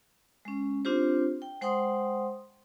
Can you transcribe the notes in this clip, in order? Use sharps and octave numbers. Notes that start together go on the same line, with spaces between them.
G#3 C#4
C4 D4 F4 G4 C5
G5
G#3 C5 F#5 G5 C6 D#6